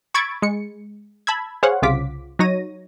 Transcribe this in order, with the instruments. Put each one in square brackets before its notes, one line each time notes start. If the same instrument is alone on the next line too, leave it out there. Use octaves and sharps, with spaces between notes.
[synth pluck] B5 C#6 E6 G#6 A6 D7
G#3 C#7
A5 B5 E6 G#6
G#4 C5 C#5 F5 F#5
C2 C#3 F4 D6 B6
F#3 D#4 C#5 A#6 D#7